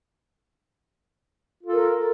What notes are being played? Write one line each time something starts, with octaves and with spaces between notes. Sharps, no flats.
F4 A4 A#4